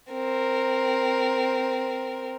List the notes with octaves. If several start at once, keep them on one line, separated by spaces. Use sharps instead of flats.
C4 A#4